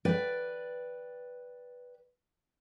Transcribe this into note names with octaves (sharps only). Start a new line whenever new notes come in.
B4 D5 G5